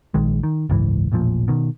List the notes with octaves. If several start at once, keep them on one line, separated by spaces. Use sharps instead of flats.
A#1 D#3 G#3
D#3
F#1 C#2 G#2 E3
E1 A1 A#2 F3
B2 D#3